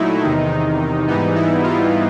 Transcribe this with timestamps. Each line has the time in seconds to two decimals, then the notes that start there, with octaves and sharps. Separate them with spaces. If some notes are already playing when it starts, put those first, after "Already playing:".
Already playing: A#2 F#3 A3 D#4 E4
0.23 E2 C3 D#3
1.08 G#2 E3 G3 B3 D#4
1.35 E4
1.63 F4